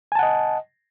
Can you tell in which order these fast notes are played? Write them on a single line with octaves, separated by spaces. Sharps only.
G#5 A5 F#5 D#5